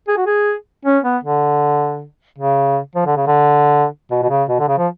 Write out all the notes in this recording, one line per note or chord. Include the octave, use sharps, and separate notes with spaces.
G#4
F#4
G#4
C#4
B3
D3
C#3
F3
D3
C#3
D3
B2
B2
C#3
B2
D3
C#3
F3